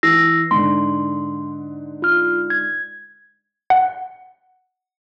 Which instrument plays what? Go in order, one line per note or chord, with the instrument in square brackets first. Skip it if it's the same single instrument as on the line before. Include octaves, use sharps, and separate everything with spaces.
[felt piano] E3 [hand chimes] E6 A#6 C7
[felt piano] G#2 D3 [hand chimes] C6
[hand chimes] F4 F6
G#6
[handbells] F#5